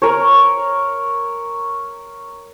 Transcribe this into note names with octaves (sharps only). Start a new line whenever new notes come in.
A#4 C#5